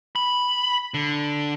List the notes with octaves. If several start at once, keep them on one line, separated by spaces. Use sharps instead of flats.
B5
D3